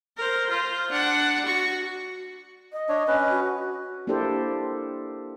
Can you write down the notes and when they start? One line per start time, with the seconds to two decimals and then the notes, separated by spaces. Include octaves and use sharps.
0.17 A#4 C5
0.50 F4 C5
0.91 D4 F#5
1.46 F#4 C#6
2.73 D#5
2.89 D4 C#5
3.08 C#4 B4
3.30 F#4
4.07 A#3 D4 E4 G4 A4 C5